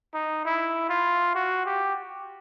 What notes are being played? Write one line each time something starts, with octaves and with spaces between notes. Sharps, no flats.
D#4
E4
F4
F#4
G4